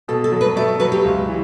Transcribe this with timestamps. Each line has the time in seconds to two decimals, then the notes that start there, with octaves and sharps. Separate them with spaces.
0.08 B2 A4
0.24 A4
0.32 F#3
0.41 B4
0.56 A3 D5
0.80 F#3 B4
0.92 G4
1.04 C#2
1.28 E3